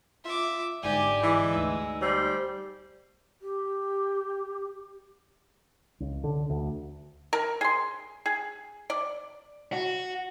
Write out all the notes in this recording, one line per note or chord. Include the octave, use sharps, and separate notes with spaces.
F4 E5 D6
G1 G#2 G4 D5 G#5
E3 G#3
D2 D#4 E6
G3 C5
G4
C#2
D3
D2
A#4
G#4 C6
G#4
D5
F#4